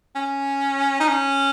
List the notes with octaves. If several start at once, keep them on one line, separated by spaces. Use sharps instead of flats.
C#4
D#4
C#4